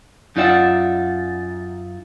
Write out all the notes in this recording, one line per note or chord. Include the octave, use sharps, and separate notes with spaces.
F#2 D#4 F4 D5 E5 F#5